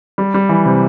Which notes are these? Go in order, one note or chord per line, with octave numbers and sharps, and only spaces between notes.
G3
G3
E3
C3